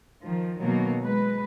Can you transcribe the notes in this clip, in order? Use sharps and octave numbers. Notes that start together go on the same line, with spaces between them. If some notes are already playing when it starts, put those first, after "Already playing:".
D#3 F3
B2 D#3 F#3 A#3
G#3 B4